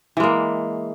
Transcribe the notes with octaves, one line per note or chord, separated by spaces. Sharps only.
E3 G#3 A#3